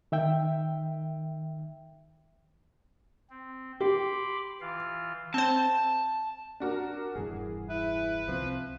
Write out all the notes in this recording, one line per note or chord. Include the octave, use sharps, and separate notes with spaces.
D#3 E5 G5
C4
G4 B5 C6 D6
E3 F4 F5
C4 C5 A5
D4 F#4 A#4
E1 G2 E3 G#4
E4 B4
C2 F3 G#3 C4